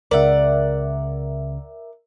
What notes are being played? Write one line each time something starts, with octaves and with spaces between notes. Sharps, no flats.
C#2 C#3 A#4 D5 E5 F#5